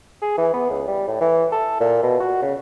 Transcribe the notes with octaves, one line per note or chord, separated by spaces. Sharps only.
G#4
E3
B3
C#2
G3
A2
E3
A4
A#2
B2
F#4
C#3